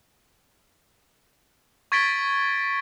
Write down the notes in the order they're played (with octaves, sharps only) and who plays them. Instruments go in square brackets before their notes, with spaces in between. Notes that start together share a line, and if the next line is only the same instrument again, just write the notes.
[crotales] C#6 G#6 A6 B6 D7 G7